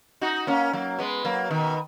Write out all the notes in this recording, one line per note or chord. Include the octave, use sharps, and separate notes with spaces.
D#4 F#4
A#3 C#4
F#3 A#3
G#3 B3
F#3 A#3
B2 D#3